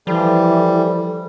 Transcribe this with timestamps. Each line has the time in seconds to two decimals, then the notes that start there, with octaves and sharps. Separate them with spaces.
0.07 E3 F3 G3 A4